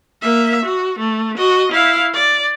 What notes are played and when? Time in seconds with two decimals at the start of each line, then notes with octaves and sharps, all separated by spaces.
0.22 A#3 E5
0.65 F#4
0.99 A3
1.38 F#4 D#5
1.72 E4 F5
2.14 D5